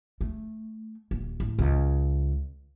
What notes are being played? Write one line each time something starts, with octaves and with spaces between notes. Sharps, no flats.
A3
D#1
A2
C#2